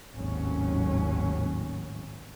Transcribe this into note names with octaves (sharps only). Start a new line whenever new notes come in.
G#1 D#2 A2 F#3 C#4